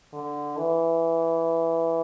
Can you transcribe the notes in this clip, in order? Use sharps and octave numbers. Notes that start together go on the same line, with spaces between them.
D3
E3